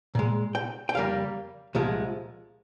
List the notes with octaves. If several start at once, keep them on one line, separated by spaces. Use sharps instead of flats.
A#2 G#3
G5
G5
F2 C#3 G3 A#3 F5
C2 A#2 F3 G#3